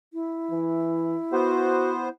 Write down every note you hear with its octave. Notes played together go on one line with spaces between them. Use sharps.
E4
E3
B3 F#4 C5